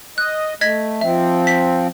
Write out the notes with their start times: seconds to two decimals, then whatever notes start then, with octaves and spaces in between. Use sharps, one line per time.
0.18 D#5 F#6
0.61 A3 D#5 G#6 B6
1.01 F3 C4 E5
1.47 B6